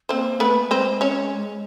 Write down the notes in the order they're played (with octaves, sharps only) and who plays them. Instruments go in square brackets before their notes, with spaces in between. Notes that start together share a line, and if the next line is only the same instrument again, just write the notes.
[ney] A#3 [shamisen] C4 C5
[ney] A3 [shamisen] B3 B4
[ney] G#3 [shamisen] C4 C5
[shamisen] C#4 C#5